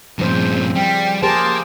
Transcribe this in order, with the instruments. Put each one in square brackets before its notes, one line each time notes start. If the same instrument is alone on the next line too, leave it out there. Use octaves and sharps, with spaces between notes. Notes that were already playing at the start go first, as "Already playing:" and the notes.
[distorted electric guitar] G2 A#2 [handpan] C#3 F3 C5 [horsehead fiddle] C4
[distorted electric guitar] G3 [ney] G5
[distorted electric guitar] A#3 [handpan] G4 G#4 C5 [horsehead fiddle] A5 [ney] C6